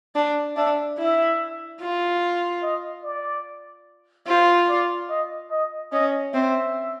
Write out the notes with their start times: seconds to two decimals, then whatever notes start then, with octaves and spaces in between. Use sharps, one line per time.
0.15 D4
0.56 D4 E5
0.98 E4 E5
1.80 F4
2.62 D#5
3.03 D5
4.27 F4 C5
4.69 D5
5.09 D#5
5.51 D#5
5.92 C#4 D#5
6.33 C4 E5